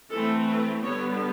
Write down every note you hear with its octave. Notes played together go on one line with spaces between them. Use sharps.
E3 A3 C4 A4
B4
D3 G3 B3 C#5